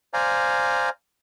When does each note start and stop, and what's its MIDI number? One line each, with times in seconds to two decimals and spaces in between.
0.14 0.89 72
0.14 0.89 74
0.14 0.89 77
0.14 0.89 80
0.14 0.89 82